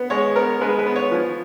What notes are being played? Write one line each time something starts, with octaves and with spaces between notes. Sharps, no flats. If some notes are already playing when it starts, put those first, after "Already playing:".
Already playing: B3
G#3 C#5
B3 A#4
G#3 B4
B4
B3
C#5
F3